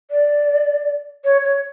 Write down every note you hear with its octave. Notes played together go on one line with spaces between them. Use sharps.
D5
C#5
C#5